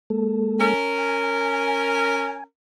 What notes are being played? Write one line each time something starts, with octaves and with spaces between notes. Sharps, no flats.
G#3 A#3 A4
C#4 A#4
G#5